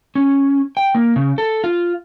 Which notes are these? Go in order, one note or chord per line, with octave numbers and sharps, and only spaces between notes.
C#4
G5
A#3
C#3
A4
F4